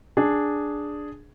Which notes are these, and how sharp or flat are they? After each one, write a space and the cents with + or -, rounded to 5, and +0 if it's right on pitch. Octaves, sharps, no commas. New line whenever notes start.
D4 +0 G#4 +0